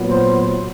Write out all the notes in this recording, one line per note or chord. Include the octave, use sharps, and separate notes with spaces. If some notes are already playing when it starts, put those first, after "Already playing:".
Already playing: A#2 F#3 B3
C5